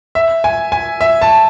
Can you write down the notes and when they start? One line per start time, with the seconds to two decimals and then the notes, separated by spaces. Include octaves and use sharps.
0.15 E5
0.44 G#5
0.72 G#5
1.01 E5
1.22 A5